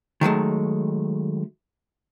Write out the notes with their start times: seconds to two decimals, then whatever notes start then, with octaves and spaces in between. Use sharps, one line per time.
0.21 D#3 F#3 G#3 A3